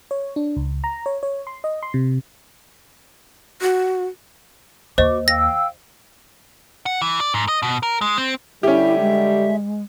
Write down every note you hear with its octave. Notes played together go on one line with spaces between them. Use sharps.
C#5
D4
C#2
A#5
C#5
C#5
C6
D#5
C6
C3
F#4
D#2 F#4 C5 D#5 C#6 D6
F5 G5 E6 A#6
F#5
E3
D5
G#2
D#5
B2
A#4
G#3
C4
D3 G3 C#4 E4 G4 E5
G#3